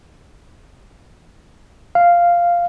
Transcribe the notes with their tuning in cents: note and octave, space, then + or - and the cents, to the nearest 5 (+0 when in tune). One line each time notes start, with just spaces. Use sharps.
F5 -5